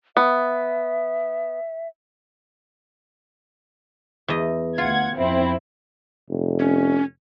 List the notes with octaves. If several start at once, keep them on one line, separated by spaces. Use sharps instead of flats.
B3 E5
E2 D#5
D2 F4 F#5 G#6
F2 C4 E4
F1
C#4